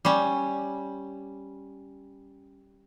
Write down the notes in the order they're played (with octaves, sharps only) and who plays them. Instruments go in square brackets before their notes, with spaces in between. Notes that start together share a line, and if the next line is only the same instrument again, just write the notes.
[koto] G3 C#4